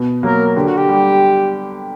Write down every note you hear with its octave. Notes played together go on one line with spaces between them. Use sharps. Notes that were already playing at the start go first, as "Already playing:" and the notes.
Already playing: B2
F#3 A#3 A#4
D3 G4
F#4
G4
G3